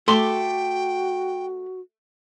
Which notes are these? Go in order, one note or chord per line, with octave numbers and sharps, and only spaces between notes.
A3 F#4 G5 C6 D6